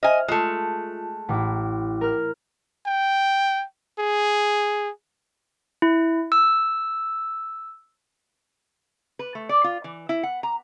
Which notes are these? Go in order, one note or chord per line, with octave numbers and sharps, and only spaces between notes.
C5 D#5 E5 G#5 F6
G#3 A3 F4 A5
A1 E4 F#5 G5 D6
A#4 F6
G5
G#4
E4
E6
B4
A3
D5
F4
E3
E4
F#5
A#5